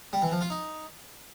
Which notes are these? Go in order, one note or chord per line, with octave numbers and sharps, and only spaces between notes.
G3
E3
F3
F4
D#4